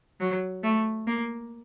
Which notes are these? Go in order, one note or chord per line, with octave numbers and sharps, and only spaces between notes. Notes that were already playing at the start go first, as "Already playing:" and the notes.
F#3
A3
A#3